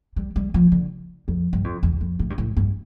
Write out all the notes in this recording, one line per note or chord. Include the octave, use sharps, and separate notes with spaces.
G3
G3
F3
D3
F2
G2
F2
E2
F2
A2
G2
A2
G2